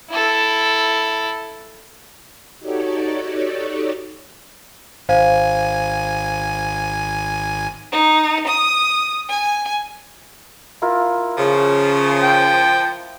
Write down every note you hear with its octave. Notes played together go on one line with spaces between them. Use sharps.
E4 A4
D#4 F#4 G4 A4 C#5 D5
G#1 C5 F5 G#5
D#4
D#6
G#5
E4 F4 A#4
C#3 F3
G5